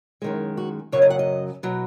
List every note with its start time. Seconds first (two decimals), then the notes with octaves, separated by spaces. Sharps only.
0.22 F#2 D#3 G#3
0.57 F#4
0.92 F#2 C#3 F#3 C#5
1.02 D#5
1.10 F#5
1.19 D#5
1.63 B2 F#3